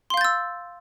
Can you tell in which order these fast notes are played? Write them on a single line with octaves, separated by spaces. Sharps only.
C6 F5 G6 A6 E6